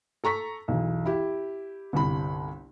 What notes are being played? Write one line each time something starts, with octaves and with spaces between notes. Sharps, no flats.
A4 A#5 C#6 B6
B1 E2
E4 G4
G1 C2 B5